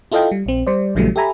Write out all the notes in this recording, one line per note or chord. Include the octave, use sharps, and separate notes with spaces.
E4 F4 A4 D#5 F5 G5
G3
A#1 C4
G3 C5 D5
A#1 C#3 E3 F#3 G3 A3
G4 A4 E5 G#5 A#5 B5